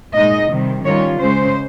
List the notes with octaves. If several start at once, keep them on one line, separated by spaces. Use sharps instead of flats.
A#2 G#3 D#4 D#5
C3 D#3 G3
D#3 G3 C#4 F4 C#5
C#3 G#3 C#4 C5